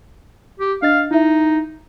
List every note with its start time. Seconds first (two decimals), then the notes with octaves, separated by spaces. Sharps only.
0.59 G4
0.82 D4 D#5 F5 A6
1.11 D#4 E4 E5